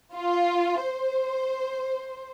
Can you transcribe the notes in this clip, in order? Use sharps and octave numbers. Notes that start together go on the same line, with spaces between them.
F4
C5